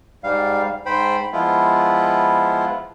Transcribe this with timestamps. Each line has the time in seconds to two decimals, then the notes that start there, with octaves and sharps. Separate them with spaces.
0.24 G#2 G3 F5
0.86 G#2 C5 G5 B5
1.33 F3 G#3 B3 E4 F4